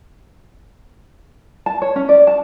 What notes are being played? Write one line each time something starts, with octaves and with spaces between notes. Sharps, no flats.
A5
C#5
C#4
D5
A5